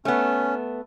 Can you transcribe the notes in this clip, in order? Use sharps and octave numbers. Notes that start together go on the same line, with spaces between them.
A3 B3 C#4